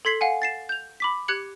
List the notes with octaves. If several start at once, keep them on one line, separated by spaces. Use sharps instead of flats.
A4 C6 G#6 B6 C7 F#7
F5 F#5 G#5
A6 C7 E7
G6 F7
B5 D6 B6
G4 F#6 G#6 C#7 F#7